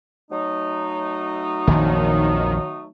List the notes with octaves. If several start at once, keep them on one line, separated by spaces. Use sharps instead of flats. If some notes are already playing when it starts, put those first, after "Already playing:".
F#3 A3 D#4
A#1 F2 A#2 D#3